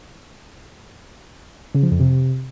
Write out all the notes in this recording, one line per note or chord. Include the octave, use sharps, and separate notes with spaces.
C#3
F3
F2
C3